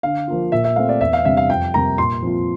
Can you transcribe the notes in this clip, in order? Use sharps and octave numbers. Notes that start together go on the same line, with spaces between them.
D3 F5
F3 A#3 F4
A#2 E5
E5
A3 C4 F5
D5
E2 E5
F5
C3 G3 D4 E5
F5
F2 G5
C3 G3 A#3 A#5
A#2 C6
F3 C4 F4